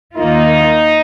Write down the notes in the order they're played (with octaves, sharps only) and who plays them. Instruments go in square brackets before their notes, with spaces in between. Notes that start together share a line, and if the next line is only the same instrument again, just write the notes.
[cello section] D#2 D#3 A#3 F4 [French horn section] D#4